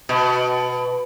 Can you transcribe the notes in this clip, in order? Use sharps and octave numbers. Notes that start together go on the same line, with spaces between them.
B2